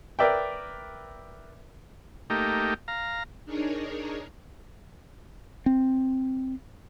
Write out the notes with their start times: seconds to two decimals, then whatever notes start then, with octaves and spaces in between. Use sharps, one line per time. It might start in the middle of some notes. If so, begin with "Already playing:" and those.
0.19 A#4 B4 D5 E5 G5
2.30 A3 A#3 D#4 G4
2.88 F5 A#5
3.46 D4 D#4 G#4 A#4 C#5
5.66 C4